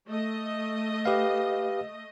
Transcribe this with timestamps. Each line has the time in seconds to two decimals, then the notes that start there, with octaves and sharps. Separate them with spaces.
0.10 A3 D#5
1.05 G4 B4 F5